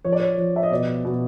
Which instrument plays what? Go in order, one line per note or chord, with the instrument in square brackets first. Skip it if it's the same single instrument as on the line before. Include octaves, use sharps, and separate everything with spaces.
[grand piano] F3 C#5
D5
C#5
F3
E5
D#5
B2 D5
B2